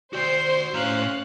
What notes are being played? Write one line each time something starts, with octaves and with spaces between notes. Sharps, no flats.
F#4 C5 D5 G5 C7
A2 C#4 F5 A#5 F#6